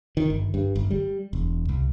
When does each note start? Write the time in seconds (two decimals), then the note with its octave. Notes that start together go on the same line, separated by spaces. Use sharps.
0.17 D#3
0.30 G1
0.54 G2
0.76 G1
0.91 G3
1.33 E1
1.69 C2